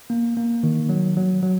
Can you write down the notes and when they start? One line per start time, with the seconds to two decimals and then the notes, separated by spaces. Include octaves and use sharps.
0.10 A#3
0.37 A#3
0.63 D#3
0.89 F#3
1.17 F#3
1.43 F#3